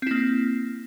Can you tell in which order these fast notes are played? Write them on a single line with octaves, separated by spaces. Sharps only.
C4 E4 A#3